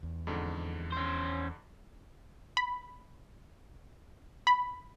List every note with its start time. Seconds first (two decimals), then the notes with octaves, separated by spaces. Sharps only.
0.03 E2
0.27 F2 G#2 D3
0.93 C#4 C5
2.57 B5
4.47 B5